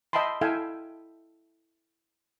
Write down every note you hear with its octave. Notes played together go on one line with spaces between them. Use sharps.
D#5 E5 G5 A5 B5 C6
E4 A4 E5 F5 G5 G#5